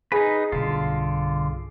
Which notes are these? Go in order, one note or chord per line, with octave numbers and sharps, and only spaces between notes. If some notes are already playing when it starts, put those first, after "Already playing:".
D#4 G#4 B4
B1 G2 D3 F4